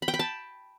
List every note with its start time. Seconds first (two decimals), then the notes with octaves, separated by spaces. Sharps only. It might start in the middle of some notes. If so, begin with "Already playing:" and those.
0.02 B5
0.08 G5
0.14 B5
0.19 A5